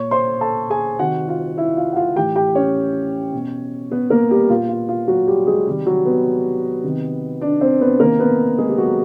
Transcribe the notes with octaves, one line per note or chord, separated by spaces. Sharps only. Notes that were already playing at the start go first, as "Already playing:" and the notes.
Already playing: A#2 C#5 C#6
C5 C6
A4 A5
G#4 G#5
C3 D#3 F#4 F#5
F4 F5
E4 E5
F4 F5
F#5
F4 F5
A2 E3 G4 G5
G4 G5
C#4 C#5
B2
B3 B4
A#3 A#4
G3 G4
A#2 F4
F4
F4
F#3 F#4
G3 G4
G#3 G#4
C3 D#3 G3 G4
F#3 F#4
B3 B4
C3 D#3
D4 D5
C4 C5
B3 B4
C3 D#3 A#3 A#4
B3 B4
G#3 G#4
G4
F#3 F#4